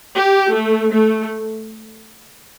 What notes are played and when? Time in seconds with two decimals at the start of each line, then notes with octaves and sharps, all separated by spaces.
0.16 G4
0.54 A3
0.91 A3